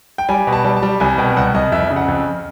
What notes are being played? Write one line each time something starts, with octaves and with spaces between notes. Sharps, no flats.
G5
G3 G#5
B2
A5
G3
A5
G3
C2 G#5
B2 G5
C2 F#5
C2 D#5
F2 E5
C#3
F#5
F2